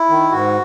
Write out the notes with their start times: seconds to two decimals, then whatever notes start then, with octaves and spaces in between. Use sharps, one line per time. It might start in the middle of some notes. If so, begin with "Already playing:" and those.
Already playing: E4
0.09 D#3
0.32 G#2 F#4